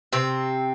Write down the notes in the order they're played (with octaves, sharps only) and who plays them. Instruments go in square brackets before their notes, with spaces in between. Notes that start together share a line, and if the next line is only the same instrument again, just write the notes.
[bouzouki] C3 C4